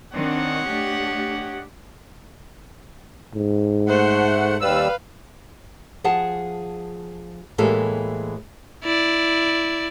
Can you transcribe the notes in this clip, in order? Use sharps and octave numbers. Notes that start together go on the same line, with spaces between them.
D#3 C4 D4 C#5 D#5 F#5
A3 D4 G4
G#2
A3 C5 F#5
D#2 G3 B4 F5 E6
F3 G#4 F#5 A5
A2 E3 G#3 A#3 G4 A4
E4 D5